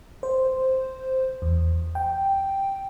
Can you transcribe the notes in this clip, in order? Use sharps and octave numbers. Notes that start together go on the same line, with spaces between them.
C5
E2
G5